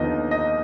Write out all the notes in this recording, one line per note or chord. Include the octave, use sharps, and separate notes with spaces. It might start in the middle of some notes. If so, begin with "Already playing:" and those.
Already playing: D#2 D3 F3 B3 D#4 D#5
D#5